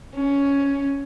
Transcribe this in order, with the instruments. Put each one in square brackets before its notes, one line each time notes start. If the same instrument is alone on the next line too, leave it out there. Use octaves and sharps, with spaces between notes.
[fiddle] C#4